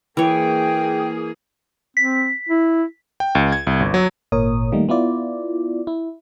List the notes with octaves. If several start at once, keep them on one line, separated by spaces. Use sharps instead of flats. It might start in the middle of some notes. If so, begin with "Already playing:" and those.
E3 A#3 G#4 C#5 G5
C4 B6
E4
G5
C#2
G#6
C2
G1
F#3
G#1 A#2 A#4 C#5 D#6
D#3 G3 A3 A#3 D#4
B3 E4 F4 D5
E4